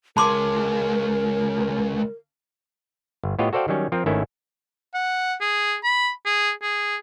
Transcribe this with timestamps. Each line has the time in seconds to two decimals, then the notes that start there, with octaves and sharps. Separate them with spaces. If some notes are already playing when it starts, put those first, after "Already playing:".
0.17 C#2 G#3 A#4 A5 C6 D6
3.24 G1
3.39 A2 B3 F4 G4 C#5 D#5
3.53 F#4 A4 C5 D5 F5 G5
3.68 D#3 F#3 G3 C#4
3.92 F3 C4 F4 A#4
4.06 G#1 D#3 A3 C#4 E4 E5
4.94 F#5
5.41 G#4
5.84 B5
6.26 G#4
6.62 G#4